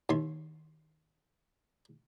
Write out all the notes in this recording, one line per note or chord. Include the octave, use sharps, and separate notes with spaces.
D#2 C6